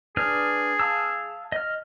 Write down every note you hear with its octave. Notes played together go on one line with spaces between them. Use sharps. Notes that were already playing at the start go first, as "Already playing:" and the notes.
D4 G#4 B4 F6
F5 A5 E6
D#5 F6